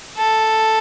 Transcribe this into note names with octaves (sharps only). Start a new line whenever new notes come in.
A4